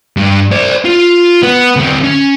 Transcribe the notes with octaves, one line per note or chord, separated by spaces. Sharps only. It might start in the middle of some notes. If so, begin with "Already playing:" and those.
G2
C5 D5
F4
B3
D2 C4
C#4